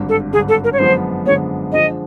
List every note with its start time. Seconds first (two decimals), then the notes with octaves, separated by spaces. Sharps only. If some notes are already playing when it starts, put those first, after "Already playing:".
Already playing: G#1 G2 D3
0.09 A4
0.32 G#1 G2 D3 G#4
0.49 A4
0.64 A#4
0.73 C#5
0.79 F#2 D3 F3 G#3 B3 C5
1.25 F#2 D3 F3 G#3 B3 C#5
1.72 D3 F3 G#3 D#5